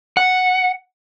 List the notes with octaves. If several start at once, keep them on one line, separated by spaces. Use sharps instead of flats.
F#5